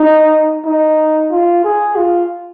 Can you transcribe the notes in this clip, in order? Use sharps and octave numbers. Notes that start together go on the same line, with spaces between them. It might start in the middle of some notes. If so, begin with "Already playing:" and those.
Already playing: D#4
D#4
F4
G#4
F4